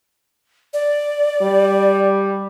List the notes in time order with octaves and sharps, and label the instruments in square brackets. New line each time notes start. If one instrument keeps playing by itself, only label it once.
[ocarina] D5
[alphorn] G3